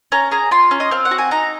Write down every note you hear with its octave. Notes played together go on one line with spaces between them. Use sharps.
C#4 A#5
G#4 A#5
F4 C6
C#4
D#5
C4 F5
F#5
F#4
G#5
D#4 A#5